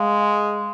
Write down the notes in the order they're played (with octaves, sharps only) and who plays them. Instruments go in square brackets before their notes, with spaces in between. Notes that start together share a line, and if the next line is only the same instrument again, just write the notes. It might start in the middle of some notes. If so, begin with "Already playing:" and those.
Already playing: [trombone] G#3 [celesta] F5